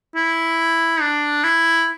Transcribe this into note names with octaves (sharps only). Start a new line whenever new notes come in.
E4
D4
E4